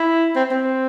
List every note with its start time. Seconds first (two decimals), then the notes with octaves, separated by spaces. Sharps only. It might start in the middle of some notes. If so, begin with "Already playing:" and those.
Already playing: E4
0.36 C4
0.51 C4